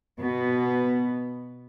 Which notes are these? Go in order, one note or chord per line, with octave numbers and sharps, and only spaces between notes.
B2 B3